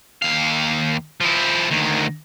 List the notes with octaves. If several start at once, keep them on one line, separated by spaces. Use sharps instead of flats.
D#2 F5
F3 E4
D2 D#3